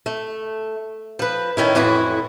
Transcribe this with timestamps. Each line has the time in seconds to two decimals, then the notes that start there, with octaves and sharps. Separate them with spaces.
0.06 A3
1.19 F3 B4
1.57 A2 D#3 C#4 E4
1.75 F2 A2 E3 E4 F#4